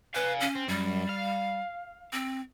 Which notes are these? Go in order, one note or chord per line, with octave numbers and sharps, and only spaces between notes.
B4 F5 G#5
C#4
C4
F#2 G3
F5
C4